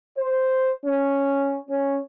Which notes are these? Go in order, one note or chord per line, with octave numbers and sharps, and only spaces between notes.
C5
C#4
C#4